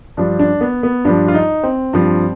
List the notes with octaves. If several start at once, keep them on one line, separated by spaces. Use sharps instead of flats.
G2 F3 D4
D4
B3
B3
G2 F3 D4
F4
D#4
C4
G2 F3